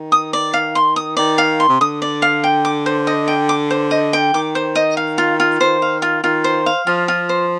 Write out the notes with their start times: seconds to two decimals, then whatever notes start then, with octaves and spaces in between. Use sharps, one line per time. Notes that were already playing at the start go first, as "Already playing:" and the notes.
Already playing: D#3
0.12 D#6
0.33 D5
0.54 F5
0.75 C6
0.96 D#6
1.17 D#3 D5
1.38 F5
1.60 C6
1.68 C3
1.80 D3 D#6
2.02 D5
2.22 F5
2.44 G5
2.65 D6
2.86 C5
3.07 D#5
3.28 G5
3.49 D6
3.71 C5
3.91 D#5
4.13 G5
4.34 D#3 D6
4.55 C5
4.76 D#5
4.97 F5
5.18 F4
5.40 F4
5.60 D#3 C5
5.82 F5
6.02 F4
6.24 D#3 F4
6.44 C5
6.66 F5
6.87 F3 F4
7.08 F4
7.29 C5